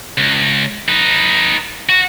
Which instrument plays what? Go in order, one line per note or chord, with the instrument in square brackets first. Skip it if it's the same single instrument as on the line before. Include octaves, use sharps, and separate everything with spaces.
[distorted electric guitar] C#2
D#4 B4
F#4